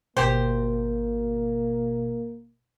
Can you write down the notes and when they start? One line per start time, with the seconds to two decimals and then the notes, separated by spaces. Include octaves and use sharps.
0.17 G#1 B2 A#3 G4 C5